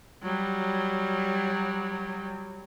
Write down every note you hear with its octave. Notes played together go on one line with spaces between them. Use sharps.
F#3 G3